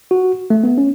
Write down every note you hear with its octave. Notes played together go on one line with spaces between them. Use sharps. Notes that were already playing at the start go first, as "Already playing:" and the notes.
F#4
A3
B3
C#4